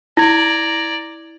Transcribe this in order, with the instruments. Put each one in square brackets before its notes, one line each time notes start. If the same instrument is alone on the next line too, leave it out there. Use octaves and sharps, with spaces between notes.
[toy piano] E4 [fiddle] D5 A#5 [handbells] G#6 A#6